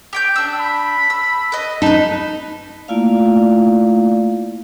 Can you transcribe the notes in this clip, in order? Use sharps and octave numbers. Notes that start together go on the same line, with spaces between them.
G4 G5 G6
D4 E6
B5
E6
B4 D#5
D#4 B4 A5 B5
A3 A#3 E4 F4 D5 F5